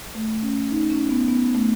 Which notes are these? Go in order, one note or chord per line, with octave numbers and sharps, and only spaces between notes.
A3
C#4
D#4
C#4
B3
B3
A3